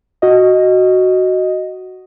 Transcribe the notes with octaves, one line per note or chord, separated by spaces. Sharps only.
F#4 D#5